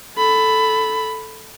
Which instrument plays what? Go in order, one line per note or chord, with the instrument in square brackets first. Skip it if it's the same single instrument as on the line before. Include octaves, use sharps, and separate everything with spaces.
[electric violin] A4 B5